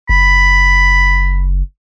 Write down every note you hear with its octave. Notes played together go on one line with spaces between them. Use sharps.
F#1 B5